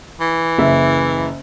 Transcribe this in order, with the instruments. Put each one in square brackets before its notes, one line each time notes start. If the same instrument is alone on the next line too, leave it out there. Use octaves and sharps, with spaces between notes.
[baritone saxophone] E3
[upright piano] F#1 E5